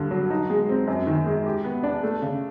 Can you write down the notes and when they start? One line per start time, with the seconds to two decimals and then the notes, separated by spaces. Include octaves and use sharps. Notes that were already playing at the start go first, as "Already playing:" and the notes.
Already playing: G2 D3
0.11 F#3
0.30 D#4
0.50 G#3
0.69 C4
0.87 F#2
1.07 D#3
1.26 G#3
1.46 G4
1.64 B3
1.83 D4
2.03 A3
2.22 C#3